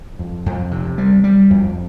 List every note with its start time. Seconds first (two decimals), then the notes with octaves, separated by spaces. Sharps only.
0.19 F2
0.46 F2
0.71 C3
0.98 G3
1.24 G3
1.50 F2